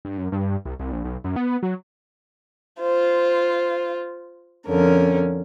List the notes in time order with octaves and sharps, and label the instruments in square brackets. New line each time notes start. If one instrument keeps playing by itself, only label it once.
[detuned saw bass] G2
F#2
G2
C2
C2
A#1
B1
F#2
B3
F#3
[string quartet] F4 C5
F2 D3 C#4 A#4